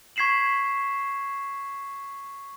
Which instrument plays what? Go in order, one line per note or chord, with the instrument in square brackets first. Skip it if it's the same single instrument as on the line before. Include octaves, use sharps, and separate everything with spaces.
[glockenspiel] C#6 G#6 B6 C7 E7 F#7